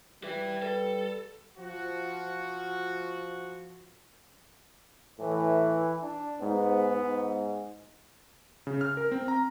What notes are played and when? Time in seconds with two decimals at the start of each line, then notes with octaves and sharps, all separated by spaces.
0.23 G3 B4 E5
0.62 A4 B4
1.58 F3 F#4
5.19 A2 E3
6.03 D4
6.41 G#2 B3
6.90 G#2
8.67 C#3
8.81 F6
8.97 A#4
9.12 C4
9.28 A#5